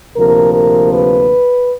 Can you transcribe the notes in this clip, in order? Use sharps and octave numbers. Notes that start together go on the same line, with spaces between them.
D2 C3 F3 A#3 A#4
A#4
B4